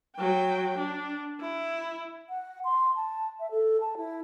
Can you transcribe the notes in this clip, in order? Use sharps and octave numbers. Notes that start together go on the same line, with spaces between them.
F#3 G5
D4
E4
F#5
C6
A5
E5
A4
A5
E4